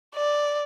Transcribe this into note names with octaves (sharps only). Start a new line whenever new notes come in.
D5